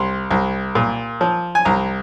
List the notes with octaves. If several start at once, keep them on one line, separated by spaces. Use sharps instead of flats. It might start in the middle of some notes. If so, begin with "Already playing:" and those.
Already playing: C2 C6
C2
A#2
F3
G#5
C2 A#5